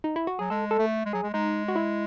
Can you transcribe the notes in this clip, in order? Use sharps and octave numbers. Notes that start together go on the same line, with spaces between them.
D#4
E4
F#4
F#3 G#4
G#3 A4
A4
A3
G#3
F#3 G#4
G#3
G#3 D#4
F#4
E4